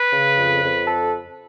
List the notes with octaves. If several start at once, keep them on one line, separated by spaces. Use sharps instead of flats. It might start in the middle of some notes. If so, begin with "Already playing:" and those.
Already playing: B4
C#3
F2
F2
A4